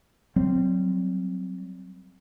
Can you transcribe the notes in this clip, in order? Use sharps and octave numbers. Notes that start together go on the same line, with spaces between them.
F#3 G3 C4